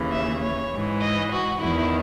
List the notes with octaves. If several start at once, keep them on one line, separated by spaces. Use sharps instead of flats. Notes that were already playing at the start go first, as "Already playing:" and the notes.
Already playing: D#2 C#3 E3
E5
C#5
G#2 E3
D#5
F#4
E2 D#3 E4